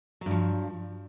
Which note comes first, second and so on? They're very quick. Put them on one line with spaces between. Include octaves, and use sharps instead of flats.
F#3 G2 F3